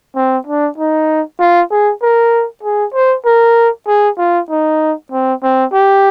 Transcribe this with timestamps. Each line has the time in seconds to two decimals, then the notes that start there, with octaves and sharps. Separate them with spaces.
0.16 C4
0.47 D4
0.78 D#4
1.40 F4
1.71 G#4
2.02 A#4
2.63 G#4
2.94 C5
3.26 A#4
3.87 G#4
4.18 F4
4.50 D#4
5.12 C4
5.43 C4
5.73 G4